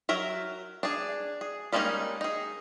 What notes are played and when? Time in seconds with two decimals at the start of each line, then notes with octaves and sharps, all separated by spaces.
0.09 F#3 A#4 E5
0.83 D4 G#4
1.41 G#4
1.73 G3 G#3 A#3 C#4 D#4
2.21 D#4 G#4